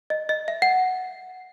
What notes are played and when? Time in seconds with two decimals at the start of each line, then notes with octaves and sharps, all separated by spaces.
0.10 D#5
0.29 D#5
0.48 E5
0.62 F#5